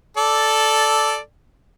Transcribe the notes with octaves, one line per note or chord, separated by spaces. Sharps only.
A4 D5